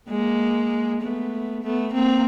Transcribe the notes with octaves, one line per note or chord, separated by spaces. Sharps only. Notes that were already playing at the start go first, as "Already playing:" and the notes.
G#3 A#3
A3 B3
A3 B3
A#3 C4